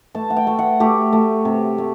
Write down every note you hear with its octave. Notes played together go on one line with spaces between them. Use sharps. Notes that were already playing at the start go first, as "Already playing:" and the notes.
A3 A5
F#5
G5
A3
F#5
A3 G4
A3
C3
A3